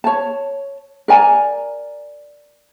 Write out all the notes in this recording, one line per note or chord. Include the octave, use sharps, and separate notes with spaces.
C#5 A5
A#4 D5 G#5 A#5